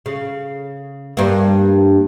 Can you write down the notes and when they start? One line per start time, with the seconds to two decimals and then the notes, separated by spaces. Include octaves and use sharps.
0.06 C#3
1.17 G2 A#3